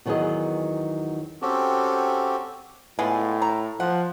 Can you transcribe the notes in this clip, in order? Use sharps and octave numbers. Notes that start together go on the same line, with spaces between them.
E2 D#3 F#3 B3 G#4 D#5
C4 C#4 F#4 G4 A4
A2 G#3 B3 F4
A#5
F3 F#5